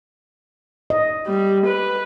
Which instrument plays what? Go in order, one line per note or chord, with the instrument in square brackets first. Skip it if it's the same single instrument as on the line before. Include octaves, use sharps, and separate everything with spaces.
[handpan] D#5
[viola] G3
B4